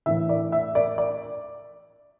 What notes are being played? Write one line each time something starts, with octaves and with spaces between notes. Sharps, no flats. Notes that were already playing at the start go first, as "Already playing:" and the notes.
A2 E3 E5
D5
E5
D5
D5